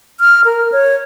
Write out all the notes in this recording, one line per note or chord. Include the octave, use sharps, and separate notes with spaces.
F6
A#4
C#5